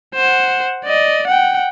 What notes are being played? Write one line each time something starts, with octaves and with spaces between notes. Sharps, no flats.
C5 F#5
D5 D#5
F#5 G5